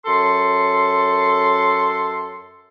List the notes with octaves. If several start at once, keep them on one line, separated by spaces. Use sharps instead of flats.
F#2 C#4 A4 C6